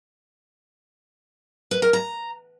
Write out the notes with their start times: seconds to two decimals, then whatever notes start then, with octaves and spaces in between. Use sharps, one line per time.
1.71 B4
1.82 A#4
1.93 A#5